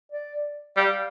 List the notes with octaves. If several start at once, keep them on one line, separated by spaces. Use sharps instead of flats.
D5
G3 F5